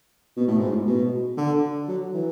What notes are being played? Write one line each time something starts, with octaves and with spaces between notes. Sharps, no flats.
B2
A2
G#2
A2
B2
D3
F#3
E3